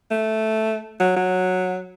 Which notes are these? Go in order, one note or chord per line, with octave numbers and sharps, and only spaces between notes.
A3
F#3
F#3